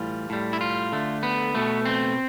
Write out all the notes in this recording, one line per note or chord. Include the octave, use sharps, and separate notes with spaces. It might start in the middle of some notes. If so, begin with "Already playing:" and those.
Already playing: A2 E3 G3 F4
A2 G3
E4
F4
D3 A3
B3
B2 A3
C4